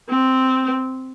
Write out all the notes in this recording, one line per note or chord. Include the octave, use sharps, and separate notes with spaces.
C4